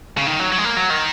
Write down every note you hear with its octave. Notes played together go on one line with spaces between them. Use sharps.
C#3
D#3
F#3
F#3
G#3
A#3
F#3
D#3